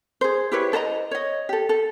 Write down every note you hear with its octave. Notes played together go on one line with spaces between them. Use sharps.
G#4 C5
E4 G4 B4 C#5
A4 C5 D#5 A#5
C#5 D#5
G4 A4
A4